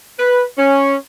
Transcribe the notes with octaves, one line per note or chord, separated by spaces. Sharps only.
B4
C#4